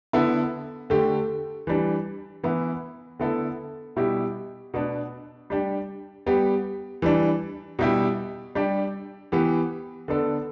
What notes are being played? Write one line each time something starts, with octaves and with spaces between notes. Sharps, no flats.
D3 B3 E4 A4
D3 A3 G4
E3 G3 D4
E3 B3 E4
D3 B3 E4 A4
B2 G3 E4 G4
B2 B3 D4
G3 D4 G4
G3 B3 G4
E3 G3 D4
B2 G3 E4 G4
G3 D4 G4
E3 B3 G4
D3 B3 D4 A4